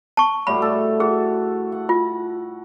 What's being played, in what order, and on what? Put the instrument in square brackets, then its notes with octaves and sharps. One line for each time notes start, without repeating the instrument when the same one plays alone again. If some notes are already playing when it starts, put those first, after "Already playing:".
[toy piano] A5 C#6
[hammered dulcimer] A2 G3 F#4 [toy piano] B5
[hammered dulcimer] A4
[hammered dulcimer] F#4 [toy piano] G#4
[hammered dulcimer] F#5
[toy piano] F4